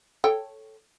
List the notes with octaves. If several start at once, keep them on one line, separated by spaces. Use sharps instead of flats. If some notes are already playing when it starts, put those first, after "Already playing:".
A4 C#5 G5